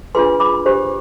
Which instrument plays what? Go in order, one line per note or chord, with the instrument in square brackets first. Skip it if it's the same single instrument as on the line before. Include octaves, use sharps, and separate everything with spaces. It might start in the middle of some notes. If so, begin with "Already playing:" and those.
[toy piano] D4 F4 G#4 B4 G#5 C6
B5 D6
D4 G4 C5